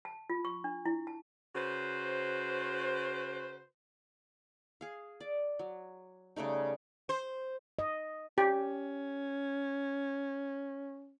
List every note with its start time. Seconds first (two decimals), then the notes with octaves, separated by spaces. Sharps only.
0.05 A5
0.30 F4
0.45 C#6
0.64 D4
0.86 E4
1.07 A5
1.55 C#3 F#4 B4 C5
4.81 G#4 F5
5.21 D5
5.59 F#3
6.36 C#3 G3 A3 D#4
7.09 C5
7.79 D#5
8.38 C#4 G4